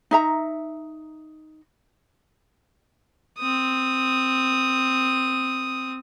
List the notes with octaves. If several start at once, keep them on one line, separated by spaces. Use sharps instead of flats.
D#4 E5 A#5
C4 D#6